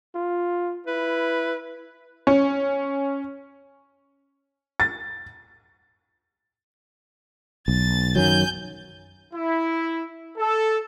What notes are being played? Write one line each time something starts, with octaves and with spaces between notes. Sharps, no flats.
F4
E4 B4
C#4
A6
B1 A6
F#2 D#3 F#3 G#5 G6
E4
A4